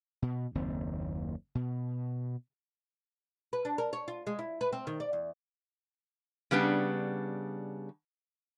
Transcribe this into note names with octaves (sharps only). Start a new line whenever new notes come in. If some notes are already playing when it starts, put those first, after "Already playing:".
B2
F#1 D#2 C4
B2
B4
D4
A#4
C#5
F4
G#3
E4
B4
C4
D#3
D5
E2
C#3 G3 B3 D4